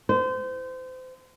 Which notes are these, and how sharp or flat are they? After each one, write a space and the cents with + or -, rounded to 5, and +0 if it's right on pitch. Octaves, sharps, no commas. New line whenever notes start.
C5 -30